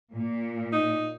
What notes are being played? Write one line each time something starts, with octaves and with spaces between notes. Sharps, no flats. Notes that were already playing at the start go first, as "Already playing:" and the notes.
A#2
D#4